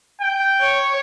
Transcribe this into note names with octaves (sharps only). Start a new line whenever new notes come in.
G5
C#5